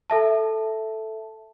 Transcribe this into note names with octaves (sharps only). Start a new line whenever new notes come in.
A4 E5 A5